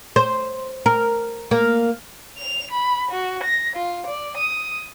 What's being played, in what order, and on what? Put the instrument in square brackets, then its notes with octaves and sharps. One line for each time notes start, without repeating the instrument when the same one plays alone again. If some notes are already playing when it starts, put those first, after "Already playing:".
[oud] C5
A#4
A#3
[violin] F7
B5
F#4
A#6
F4
D5
D#6